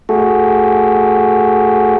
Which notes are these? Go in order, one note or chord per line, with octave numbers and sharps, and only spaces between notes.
A3 F#4 G#4 A4